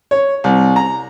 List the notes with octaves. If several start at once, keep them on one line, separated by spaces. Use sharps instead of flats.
C#5
C2
A#5